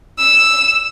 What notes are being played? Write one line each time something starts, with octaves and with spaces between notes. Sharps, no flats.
E6